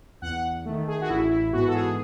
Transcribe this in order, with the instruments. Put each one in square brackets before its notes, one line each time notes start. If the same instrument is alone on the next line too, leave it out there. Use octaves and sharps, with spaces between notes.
[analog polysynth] E2 F#5
D#3 A3
G#4
F#4
A1 E4
E4
G#2 E3 B3 F#4
A4
G#4